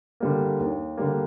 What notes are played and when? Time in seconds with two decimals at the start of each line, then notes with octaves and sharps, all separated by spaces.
0.20 D3 G3 A#3
0.59 D#2
0.97 D3 G3 A#3